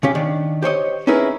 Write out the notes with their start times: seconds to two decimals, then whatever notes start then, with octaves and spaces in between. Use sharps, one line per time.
0.03 C#3 C#4 G4
0.15 D#3 D4
0.62 G4 C5 C#5 D#5
1.07 C#4 D#4 E4 G#4 A#4 B4